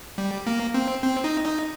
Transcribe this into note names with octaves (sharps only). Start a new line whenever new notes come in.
G3
A#3
C4
C4
D#4
D#4